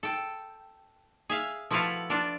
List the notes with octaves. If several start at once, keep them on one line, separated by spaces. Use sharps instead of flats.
A4 G5
G#4 E5 F5
F3 A3 E4 F#4 B4 F5
D4 F4 D5